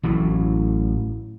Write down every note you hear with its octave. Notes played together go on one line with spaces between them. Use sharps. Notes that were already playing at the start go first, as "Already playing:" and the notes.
A1 A2 E3 F#3